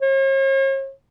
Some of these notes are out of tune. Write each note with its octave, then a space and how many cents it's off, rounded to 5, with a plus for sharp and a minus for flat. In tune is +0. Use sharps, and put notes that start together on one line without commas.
C#5 -45